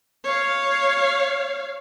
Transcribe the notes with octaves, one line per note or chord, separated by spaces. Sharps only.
C#5 F5